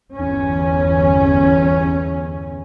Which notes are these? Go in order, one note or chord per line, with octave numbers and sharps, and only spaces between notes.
G1 E2 C#4